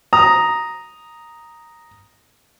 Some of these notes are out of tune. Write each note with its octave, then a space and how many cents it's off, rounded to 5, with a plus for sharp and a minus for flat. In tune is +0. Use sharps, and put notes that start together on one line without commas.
A#5 +0 D#6 +0